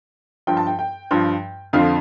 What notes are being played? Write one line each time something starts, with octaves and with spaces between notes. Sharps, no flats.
G2 F3 G5
A5
G5
G5
G2 F3
F2 D3 F3 F5